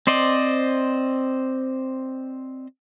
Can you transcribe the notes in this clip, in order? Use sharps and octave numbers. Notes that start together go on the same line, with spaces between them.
C4 C5 D5 D#5